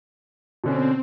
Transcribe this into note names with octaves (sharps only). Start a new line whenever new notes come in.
B2 D3 C4 C#4